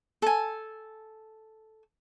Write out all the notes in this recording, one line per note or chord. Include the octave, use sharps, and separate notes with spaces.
A4 G#5